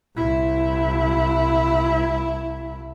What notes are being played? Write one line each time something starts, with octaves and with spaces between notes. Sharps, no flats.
C2 E4